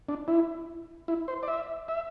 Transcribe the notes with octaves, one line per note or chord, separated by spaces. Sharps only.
D4
E4
E4
C5
D5
E5
E5